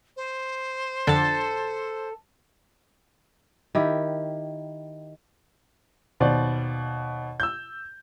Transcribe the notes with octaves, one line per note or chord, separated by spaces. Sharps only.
C5
F2 D3 D4 A4 A5
D#3 E4 G4
D#2 B2 C5 D5
E6 G6